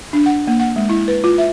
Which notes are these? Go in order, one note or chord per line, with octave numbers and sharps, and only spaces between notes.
D4
F#5
A#3
F#5
G#3
E4
B4
F4
E5